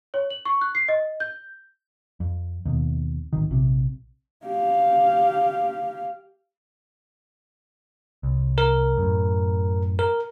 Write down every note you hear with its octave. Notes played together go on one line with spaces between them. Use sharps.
C#5
F#7
C#6
F#6
C7
D#5
G6
F2
D#2 B2
D1 G#1 D#3
A#1 C3
G4 F5
C2
A#4
F#2 A2
A#4